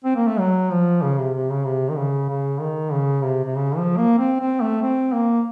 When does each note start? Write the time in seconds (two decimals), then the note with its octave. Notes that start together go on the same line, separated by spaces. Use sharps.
0.04 C4
0.16 A#3
0.27 A3
0.39 F#3
0.70 F3
1.02 C#3
1.18 C3
1.34 C3
1.50 C#3
1.65 C3
1.90 D#3
1.98 C#3
2.29 C#3
2.60 D#3
2.92 C#3
3.24 C3
3.44 C3
3.55 C#3
3.77 F3
3.97 A#3
4.19 C4
4.40 C4
4.61 A3
4.82 C4
5.13 A#3